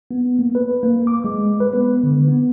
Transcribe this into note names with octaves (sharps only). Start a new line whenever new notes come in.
B3
A#3
B4
A#3
D6
G#3
B4
B3
D3
B3